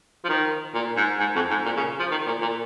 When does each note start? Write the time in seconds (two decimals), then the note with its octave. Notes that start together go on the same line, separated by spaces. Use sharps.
0.24 F3
0.29 D#3
0.74 A#2
0.97 G#2
1.20 G#2
1.35 F2
1.50 G#2
1.65 A#2
1.76 C#3
1.99 F3
2.11 D#3
2.27 A#2
2.41 A#2